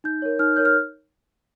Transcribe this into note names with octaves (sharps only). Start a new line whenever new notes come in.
D#4 G6
A#4 C#5
D#4 F6
A#4 C#5 G6
F6